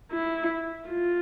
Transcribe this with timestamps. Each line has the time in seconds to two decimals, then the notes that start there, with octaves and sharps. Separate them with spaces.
0.12 E4
0.89 F4